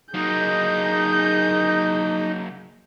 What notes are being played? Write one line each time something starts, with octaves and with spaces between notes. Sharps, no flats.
F#3 A#3 D#4 G#4 G6